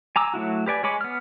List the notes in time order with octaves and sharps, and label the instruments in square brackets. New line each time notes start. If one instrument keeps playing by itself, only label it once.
[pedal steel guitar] G#5 A#5 D6 E6
F#3 A3 E4 F#4
G4 B4 D5 G#5
G#3 C#5 G#5 B5 D6
B3 F6